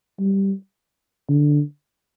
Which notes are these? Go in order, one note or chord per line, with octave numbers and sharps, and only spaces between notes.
G3
D3